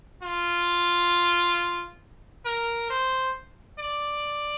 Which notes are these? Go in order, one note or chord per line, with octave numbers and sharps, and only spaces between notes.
F4
A#4
C5
D5